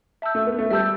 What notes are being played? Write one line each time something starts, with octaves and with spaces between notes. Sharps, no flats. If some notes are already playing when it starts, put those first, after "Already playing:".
E5 A5 E6 G6
A3
B3
A3
G3 E5 A5 E6 G6